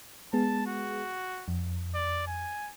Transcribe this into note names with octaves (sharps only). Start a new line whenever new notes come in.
G#3 B3 G#4 A5
F#4
F2
D5
G#5